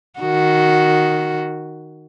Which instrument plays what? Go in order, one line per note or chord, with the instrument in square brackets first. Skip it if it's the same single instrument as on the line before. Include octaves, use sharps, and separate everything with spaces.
[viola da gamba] D#3 F#4